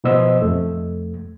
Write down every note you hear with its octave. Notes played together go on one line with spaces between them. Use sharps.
B2 F3 B3 C5 D#5 E6
F2 A3